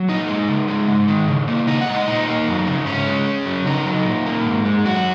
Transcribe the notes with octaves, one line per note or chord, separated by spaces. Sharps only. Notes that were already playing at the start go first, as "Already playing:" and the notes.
Already playing: F#3
A#2 D#4
G#3
C#3
G#3
G#2
D#3
C#3
A#3
A#2 D#4
F#5
G#3
D#5
A#2 D#4
A#3
F#2
C#3
G#2 C#4
G#3
C#3
F#3
C#3 D#4
F#3
A#2
A#3
G#2
G#3
F#2 F#4